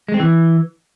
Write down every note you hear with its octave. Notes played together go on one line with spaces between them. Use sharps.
G#3
C4
E3